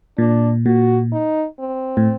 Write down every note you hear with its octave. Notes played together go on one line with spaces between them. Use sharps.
A#2 D4
A#2 F#4
D#4
C4
A2